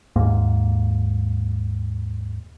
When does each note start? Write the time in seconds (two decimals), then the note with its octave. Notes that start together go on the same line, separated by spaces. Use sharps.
0.16 D#2 G#2 A#3